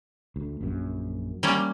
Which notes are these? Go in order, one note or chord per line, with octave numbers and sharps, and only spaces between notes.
D2
A#1 F#2
G3 A#3 C#4